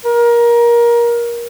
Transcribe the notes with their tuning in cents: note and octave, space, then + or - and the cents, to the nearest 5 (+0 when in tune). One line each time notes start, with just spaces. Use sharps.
A#4 +20